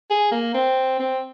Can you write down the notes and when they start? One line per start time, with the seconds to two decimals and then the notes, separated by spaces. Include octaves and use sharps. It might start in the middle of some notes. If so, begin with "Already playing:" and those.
0.10 G#4
0.32 A#3
0.54 C4
1.00 C4